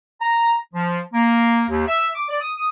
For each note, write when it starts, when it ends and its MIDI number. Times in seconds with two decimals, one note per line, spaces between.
0.21 0.54 82
0.74 0.99 53
1.14 1.63 58
1.69 1.86 39
1.87 2.09 76
2.14 2.26 86
2.29 2.36 74
2.40 2.69 87